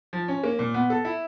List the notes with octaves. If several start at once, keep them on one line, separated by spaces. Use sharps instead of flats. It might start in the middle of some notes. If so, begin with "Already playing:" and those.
F3
C#4
A#3
A#2
B3
A4
E4